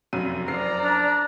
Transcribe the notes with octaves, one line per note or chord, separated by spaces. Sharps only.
F1 F#2 D#7
F#1 D5 A#5 C7
D4